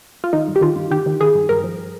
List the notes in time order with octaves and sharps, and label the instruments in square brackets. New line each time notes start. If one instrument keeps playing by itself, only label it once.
[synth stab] F4
D#3 D#4
G2
G4
D#3 F4
G2
D#3 G4
D#3
D#3 G#4
G2
G2 A#4
F3